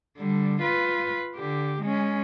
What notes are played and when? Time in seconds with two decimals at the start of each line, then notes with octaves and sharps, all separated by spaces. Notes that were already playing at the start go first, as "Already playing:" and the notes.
0.17 D3 G3
0.62 F4 B4
1.36 D3 G4
1.81 G#3 C#4